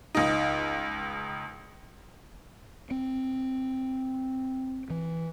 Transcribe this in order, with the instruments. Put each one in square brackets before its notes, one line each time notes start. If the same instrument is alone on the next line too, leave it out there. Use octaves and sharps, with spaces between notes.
[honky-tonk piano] C#2 D#4
[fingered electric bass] C4
E3